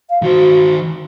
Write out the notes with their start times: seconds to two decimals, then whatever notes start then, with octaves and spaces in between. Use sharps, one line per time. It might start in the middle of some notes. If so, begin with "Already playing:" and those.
0.10 F5
0.23 D#3 F#4 C5